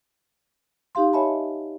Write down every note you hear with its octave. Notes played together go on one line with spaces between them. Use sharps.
D#4 G4 F5 C6
C#5 D#5 E5 G#5 A5 B5